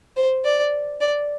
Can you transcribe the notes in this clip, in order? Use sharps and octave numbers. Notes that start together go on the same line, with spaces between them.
C5
D5
D5